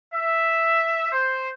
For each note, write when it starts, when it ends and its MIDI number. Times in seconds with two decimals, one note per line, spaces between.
0.13 1.08 76
1.12 1.49 72